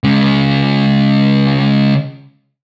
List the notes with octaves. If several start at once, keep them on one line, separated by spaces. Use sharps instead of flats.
C#3 G#3